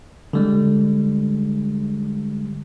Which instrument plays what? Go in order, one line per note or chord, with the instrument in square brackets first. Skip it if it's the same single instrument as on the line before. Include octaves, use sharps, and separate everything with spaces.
[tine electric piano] D3 G3 G#3